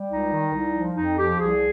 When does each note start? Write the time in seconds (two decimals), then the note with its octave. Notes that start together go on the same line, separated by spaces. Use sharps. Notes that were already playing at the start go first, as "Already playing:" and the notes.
Already playing: G3
0.09 C#2 D#4
0.31 D#3
0.53 C2
0.75 F3
0.96 F2 D#4
1.18 F3 G4
1.40 C2 G#4